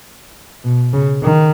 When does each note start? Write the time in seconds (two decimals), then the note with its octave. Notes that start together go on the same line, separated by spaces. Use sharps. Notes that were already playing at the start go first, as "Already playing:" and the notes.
0.64 B2
0.93 C#3
1.23 D#3